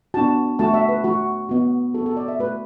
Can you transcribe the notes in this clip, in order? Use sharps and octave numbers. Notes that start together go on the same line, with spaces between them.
B3 D4 F#4 A5
A3 F#4 A5
E5
B4
A3 F#4
B3 F#4
B3 F#4 A4
A4
D5
E5
A3 F#4 B4